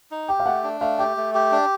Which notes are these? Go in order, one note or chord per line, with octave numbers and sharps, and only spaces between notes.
D#4
G4 G5
F5
A3 F#5
D4
A3 F5
G4 G5
A3
G4
D4